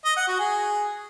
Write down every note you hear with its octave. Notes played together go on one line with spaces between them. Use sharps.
D#5
F#5
F#4
G#4